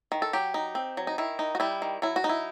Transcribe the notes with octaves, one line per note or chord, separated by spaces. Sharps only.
D#3
A4
F#3 G4
D#4
C4
F#3
D#4
D#3 E4
D#4
F#4
G3 E4
D#3
F#3 E4
F#4
D#4
E4